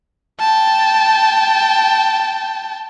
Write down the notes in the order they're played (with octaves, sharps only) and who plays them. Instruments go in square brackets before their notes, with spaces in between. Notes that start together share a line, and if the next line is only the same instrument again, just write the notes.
[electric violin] G5 A5